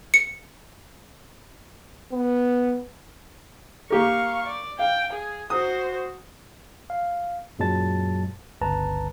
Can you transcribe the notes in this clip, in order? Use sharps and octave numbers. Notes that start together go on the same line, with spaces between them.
C#7
B3
A#3 G4 A#4 F5 C#6
D5
F5 G5
G#4
F#4 C5 D#6
F5
F#2 A#2 F#3 G#3 A5 A6
G1 C#2 B4 A5 A#5